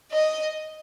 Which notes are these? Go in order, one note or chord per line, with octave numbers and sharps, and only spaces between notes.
D#5